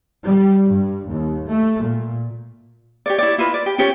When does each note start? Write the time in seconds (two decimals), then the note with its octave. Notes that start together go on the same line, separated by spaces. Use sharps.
0.25 G3
0.66 G2
1.10 D#2
1.48 A3
1.82 A#2
3.06 G4 C#5 D5
3.18 E4 C#5 D5
3.38 E4 F4 B4 D#5
3.54 D5
3.66 G4
3.78 C#4 F4 G4 C#5